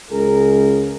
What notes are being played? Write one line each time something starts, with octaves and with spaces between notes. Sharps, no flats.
C#2 C#3 G#3 G#4 A#4